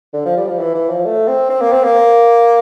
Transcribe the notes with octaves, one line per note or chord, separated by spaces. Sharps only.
D3
F3
G3
F3
E3
E3
F3
A3
C4
C4
A#3
C4
A#3